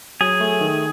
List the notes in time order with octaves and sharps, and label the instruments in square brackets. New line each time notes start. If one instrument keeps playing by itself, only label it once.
[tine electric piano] F#3 [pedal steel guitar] G#4
[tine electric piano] A3
D#3